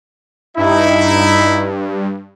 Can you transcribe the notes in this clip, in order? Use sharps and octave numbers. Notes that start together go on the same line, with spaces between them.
G2 D#4 E4